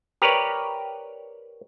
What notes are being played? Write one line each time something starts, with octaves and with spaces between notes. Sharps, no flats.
G4 A#4 B4 C#5 D5